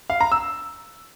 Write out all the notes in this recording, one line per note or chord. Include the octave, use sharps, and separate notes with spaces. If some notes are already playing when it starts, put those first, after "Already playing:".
F5
A#5
E6